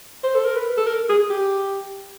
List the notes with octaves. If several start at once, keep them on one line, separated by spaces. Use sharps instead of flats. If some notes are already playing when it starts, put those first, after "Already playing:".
C5
A4
A#4
B4
A4
A#4
G#4
G4